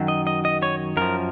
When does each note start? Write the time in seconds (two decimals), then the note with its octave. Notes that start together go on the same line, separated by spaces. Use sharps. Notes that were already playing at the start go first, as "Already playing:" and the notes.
Already playing: F#2 D#3 F#3
0.08 D#5
0.27 D#5
0.45 D#5
0.62 C#5
0.97 F#2 F3 A#4